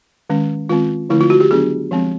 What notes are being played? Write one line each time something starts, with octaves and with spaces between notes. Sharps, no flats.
D#3 G#3 C#4
D#3 G#3 C4 F4
D3 F3 A3 C4 E4
F4
F#4
G4
D#3 F#3 B3 D4 G#4
F3 G#3 C4